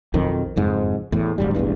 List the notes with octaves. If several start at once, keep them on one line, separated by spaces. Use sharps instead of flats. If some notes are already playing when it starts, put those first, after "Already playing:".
B1 F2 D#3
F#1 F2 G#2
E2 A2
D1 G#2 G3
E1 A1 E2 G2